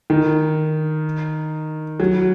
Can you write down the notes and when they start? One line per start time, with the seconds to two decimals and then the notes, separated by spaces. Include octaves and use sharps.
0.10 D#3
2.00 F#3